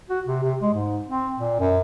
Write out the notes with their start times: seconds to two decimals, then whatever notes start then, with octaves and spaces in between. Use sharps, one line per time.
0.10 F#4
0.25 C3
0.43 C3
0.62 G#3
0.74 G#2
1.09 C4
1.37 A#2
1.59 F#2